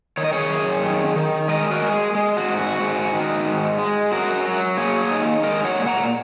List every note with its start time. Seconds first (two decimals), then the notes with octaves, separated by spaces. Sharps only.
0.17 D#3 C#5
0.24 D#5
0.33 G#4 C#5
0.50 F#2
0.83 D#3
1.16 D#3
1.48 G#3 A#4 D#5
1.70 F#4 A#4
1.82 G#3
1.93 G#4
2.15 G#3
2.37 F#4
2.48 G#2
2.58 F#4
2.80 G#2
3.13 D#3
3.46 G#2
3.79 G#3
4.12 F#3 F#4 A#4
4.45 F#3
4.77 A#3 G#4 C#5
5.11 D#4
5.43 G#3 A#4 D#5
5.65 C#5 F#5
5.76 A#2
5.87 F#5 A#5